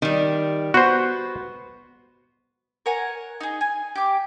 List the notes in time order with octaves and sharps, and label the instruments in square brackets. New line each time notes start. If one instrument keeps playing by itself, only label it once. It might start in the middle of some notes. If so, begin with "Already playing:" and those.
[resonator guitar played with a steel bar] D#3 G3
[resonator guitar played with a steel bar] B3 [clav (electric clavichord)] F#4 C5
[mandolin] A#4 C#5 F#5 G#5
D#4 G#4
G#5
G4 D6